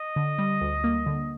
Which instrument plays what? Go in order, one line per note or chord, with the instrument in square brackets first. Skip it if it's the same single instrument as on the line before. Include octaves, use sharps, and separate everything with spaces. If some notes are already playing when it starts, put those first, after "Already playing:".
Already playing: [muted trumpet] D#5
[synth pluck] D3
G3
D2
A#3
D3